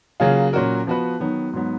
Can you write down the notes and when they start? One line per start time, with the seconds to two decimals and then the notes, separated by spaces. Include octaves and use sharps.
0.20 C#3 F#3 A#3 F4 G#4
0.53 A#2 F#3 C#4 F#4 A#4
0.87 F3 B3 F#4 B4
1.20 D#3 F#3 B3
1.53 G#2 F#3 B3